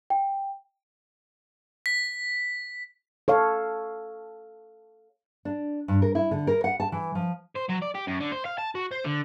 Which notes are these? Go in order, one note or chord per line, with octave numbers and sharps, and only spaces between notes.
G5
B6
A4 C#5 F5
D4
G2
A#4
E4
D3
A#4
F#5
A5
E3
F3
C5
F#3
D5
G4
F#2
D3
C5
F5
A5
F#4
C5
D3